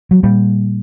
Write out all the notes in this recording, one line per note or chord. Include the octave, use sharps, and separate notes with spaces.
F#3
A#2 G3